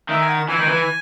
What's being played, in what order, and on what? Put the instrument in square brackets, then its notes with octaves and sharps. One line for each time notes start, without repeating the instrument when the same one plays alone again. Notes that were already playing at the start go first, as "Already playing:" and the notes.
[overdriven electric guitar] D#3 [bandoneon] E5
[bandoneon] G#5
F#5
[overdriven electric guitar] E3 [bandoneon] G#5
[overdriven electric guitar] D#3
E3